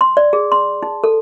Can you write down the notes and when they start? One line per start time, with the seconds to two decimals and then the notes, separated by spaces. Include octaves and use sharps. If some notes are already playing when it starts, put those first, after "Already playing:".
0.01 C6
0.17 D5
0.33 G#4
0.52 C6
0.83 D#4
1.04 A4